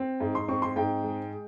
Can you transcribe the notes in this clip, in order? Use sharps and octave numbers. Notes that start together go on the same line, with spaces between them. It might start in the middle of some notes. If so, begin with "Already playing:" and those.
Already playing: C4
G#2
C6
C4 C#6
C6
G#2 G5
G#3